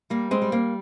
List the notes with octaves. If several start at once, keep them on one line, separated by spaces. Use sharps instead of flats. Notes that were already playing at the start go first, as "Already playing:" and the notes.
G3 A#3
G#3 C4
G3
A#3